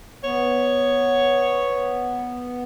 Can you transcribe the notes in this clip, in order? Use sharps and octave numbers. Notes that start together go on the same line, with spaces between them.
B3 C#5